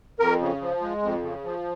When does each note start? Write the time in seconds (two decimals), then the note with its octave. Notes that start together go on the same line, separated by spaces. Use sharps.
0.20 F2 A#4
0.40 C#3
0.61 F3
0.81 G#3
1.02 F2
1.23 C#3
1.44 F3